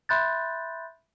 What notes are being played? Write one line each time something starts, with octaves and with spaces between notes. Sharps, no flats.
E5 B5 C6 F#6 G6 A6